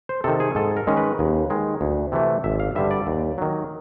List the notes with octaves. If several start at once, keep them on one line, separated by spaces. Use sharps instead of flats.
C5
C3 D#3 A4
G#4
G#2 A4
A#4
D#3 G#3 C#4
B4
D#2
D#3 G#3
D2
C3 E3 A3
G#1 E5
F5
G2 D3 G3 E5
D5
D#2
D#3 F#3